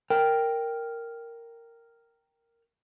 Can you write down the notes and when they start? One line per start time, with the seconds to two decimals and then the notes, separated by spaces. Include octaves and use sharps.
0.10 A#4 G5